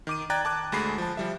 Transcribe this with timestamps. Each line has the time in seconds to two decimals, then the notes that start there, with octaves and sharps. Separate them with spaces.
0.07 D#3 D6 D#7
0.30 D5 G5 A#5 F#6 G#6 A6
0.45 A5 D6 F#6
0.72 D2 G#3 A3 B5 C7
0.98 F3 A5
1.17 F3 G3 E5